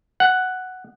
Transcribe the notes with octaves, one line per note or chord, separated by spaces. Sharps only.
F#5